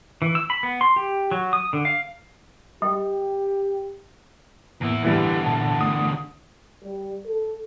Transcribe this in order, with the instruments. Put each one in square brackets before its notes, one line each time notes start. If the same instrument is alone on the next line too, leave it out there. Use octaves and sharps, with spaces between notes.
[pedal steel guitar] E3
E6
B5
B3
C6
G4
F#3
D#6
D3
F5
[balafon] G3 [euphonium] G4
[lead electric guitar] E2 E4 [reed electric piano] A2 A#3 B3
[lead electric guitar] E2 D3 [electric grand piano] E3 G3
[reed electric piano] A#2 [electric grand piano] A5
[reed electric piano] A3 [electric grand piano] D#6
[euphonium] G3
A4